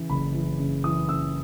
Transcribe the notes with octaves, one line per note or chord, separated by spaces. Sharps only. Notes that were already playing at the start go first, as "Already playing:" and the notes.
Already playing: C#3 E3
F#1 B5
E3
C#3
E3 D#6
C#3 E6